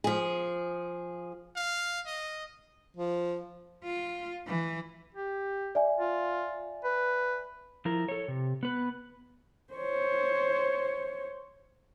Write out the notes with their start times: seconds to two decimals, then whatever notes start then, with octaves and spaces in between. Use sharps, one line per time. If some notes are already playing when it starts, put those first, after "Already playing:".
0.04 F3 G#4
1.56 F5
2.06 D#5
2.97 F3
3.84 F4
4.47 E3
5.14 G4
5.75 D5 E5 G#5
5.99 F4
6.84 B4
7.85 F3 E4 A#4
8.08 A4 C#5
8.28 C3
8.63 B3 B4
9.74 C5 C#5